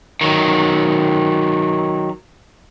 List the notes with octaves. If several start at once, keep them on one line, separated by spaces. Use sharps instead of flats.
D#3 F#3